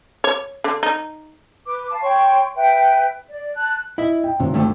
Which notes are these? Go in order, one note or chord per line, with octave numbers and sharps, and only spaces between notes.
C#5
D3
D#4
B4 D6
F5 A5
C#5 G5 C6 C#6
B4 E5 G5
D5
A5 F#6
E4 D#5 E5
G5
G#1 C3 C4 C#4
D2 G2 A3